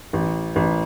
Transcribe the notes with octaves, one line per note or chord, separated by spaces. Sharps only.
A1
A1